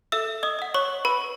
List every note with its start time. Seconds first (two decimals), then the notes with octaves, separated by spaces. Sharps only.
0.12 A4 E5 E6
0.43 D#5 D#6
0.59 D#5 F#5
0.74 C#5 C#6
1.05 B4 B5